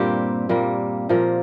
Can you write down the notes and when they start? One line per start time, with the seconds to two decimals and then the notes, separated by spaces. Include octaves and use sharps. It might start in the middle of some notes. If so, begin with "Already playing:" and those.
Already playing: G2 A#2 G3 A#3 C4 G4
0.49 A#2 G3 A#3
1.09 A#2 F3 A#3